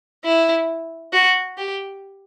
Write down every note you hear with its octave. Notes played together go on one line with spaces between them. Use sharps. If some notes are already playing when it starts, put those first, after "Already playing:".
E4
F#4
G4